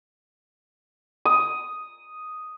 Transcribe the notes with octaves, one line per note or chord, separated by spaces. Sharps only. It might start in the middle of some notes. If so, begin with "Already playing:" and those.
D#6